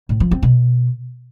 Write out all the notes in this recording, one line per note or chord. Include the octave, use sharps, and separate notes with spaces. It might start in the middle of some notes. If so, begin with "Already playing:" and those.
A2
F3
C4
B2